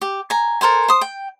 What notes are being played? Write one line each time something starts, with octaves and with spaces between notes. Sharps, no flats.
G4
G#5 A#5
A4 A#4 C5 G#5
C5 D#6
G5